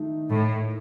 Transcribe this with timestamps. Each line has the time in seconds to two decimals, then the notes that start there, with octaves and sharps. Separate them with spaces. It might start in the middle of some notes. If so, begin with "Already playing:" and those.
Already playing: D#3 A3 D#4
0.30 A2